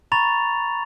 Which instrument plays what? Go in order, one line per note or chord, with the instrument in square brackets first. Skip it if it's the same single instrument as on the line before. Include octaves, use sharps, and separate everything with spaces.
[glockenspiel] A#5 B5 C#6 A6 F7